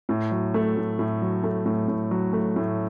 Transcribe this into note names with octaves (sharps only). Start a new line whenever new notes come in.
A2
F#3
A3
A2
A2
F#3
A3
A2
A2
F#3
A3
A2